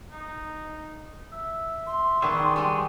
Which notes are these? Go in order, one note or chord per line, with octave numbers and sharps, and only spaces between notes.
D#4
E5
C6
D#3 B3 G#4 D5 C#6 E6
G3 G#3